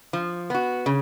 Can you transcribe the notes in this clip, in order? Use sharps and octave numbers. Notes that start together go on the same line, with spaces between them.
F3
B3 F#4
C#3